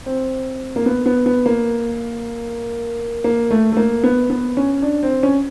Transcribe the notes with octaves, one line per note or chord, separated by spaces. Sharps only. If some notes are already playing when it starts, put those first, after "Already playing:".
C4
A#3
B3
B3
B3
A#3
A#3
A3
A3
A#3
B3
B3
C#4
D4
C4
C#4